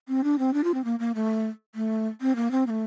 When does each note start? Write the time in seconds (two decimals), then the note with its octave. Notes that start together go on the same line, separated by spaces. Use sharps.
0.08 C4
0.24 D4
0.39 C4
0.54 D4
0.64 F4
0.74 C4
0.84 A#3
0.99 A#3
1.15 A3
1.75 A3
2.21 C4
2.36 A#3
2.51 C4
2.67 A#3
2.70 A3